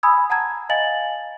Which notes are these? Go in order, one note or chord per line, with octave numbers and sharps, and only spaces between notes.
G#5 B5 D#6 E6 G#6
F#5 A5 A#5 G#6
D#5 F5 G#5 A6 F#7